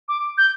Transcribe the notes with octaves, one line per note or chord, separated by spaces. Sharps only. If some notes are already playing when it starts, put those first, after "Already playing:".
D6
G6